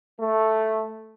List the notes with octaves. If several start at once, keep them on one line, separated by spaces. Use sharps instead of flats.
A3